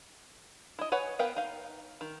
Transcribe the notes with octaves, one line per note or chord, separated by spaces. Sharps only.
E4 D#5
B4 C#5 F#5 G#5
B3 A#4 B4 F5 G5
D#4 F5
D#3